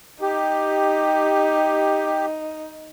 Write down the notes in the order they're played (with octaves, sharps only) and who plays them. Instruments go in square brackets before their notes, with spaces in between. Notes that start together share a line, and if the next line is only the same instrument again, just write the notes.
[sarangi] D#4 [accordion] G4